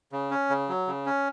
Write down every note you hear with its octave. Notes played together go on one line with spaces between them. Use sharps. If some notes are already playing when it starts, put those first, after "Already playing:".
C#3
C#4
C#3
F#3
C#3
C#4